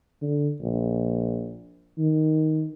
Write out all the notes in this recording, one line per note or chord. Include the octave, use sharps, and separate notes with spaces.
D3
A#1
D#3